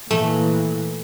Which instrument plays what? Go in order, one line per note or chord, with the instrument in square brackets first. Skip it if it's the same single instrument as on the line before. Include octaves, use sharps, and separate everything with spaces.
[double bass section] A#2 E3 [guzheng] A3